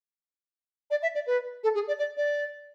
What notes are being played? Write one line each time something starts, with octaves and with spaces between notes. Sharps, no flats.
D5
E5
D5
B4
A4
G#4
D5
D5
D5